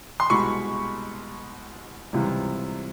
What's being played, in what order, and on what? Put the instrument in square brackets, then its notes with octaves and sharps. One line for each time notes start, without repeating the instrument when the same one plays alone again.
[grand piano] C6
[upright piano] C2 B2 G#3 [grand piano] B5 C#6
[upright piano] C#2 C3 E3 G3